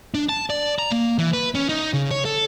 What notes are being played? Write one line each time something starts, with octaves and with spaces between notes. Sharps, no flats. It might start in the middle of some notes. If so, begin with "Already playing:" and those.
D4
A5
D5
A#5
A#3
E3
B4
C#4
D#4
C#3
C#5
A4